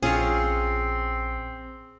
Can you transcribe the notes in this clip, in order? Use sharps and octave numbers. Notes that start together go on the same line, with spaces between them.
A#1 C4 C#4 F4 G#4 C#5 C#6